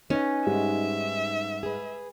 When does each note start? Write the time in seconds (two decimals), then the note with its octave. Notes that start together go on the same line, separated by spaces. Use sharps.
0.10 C#4 D#4 B4 D#5
0.47 G#2 G3 G#3 E5
1.63 G#4 B4